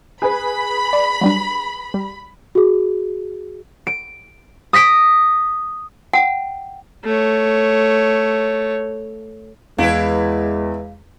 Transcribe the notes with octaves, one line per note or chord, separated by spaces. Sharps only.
G#4 B4 B5
D5
F#3 G3 D4
G3
F#4 G#4
D7
D#6 A#6 B6 D7
F#5 G5
A3 C#5
E2 G#3 E4 B4 F5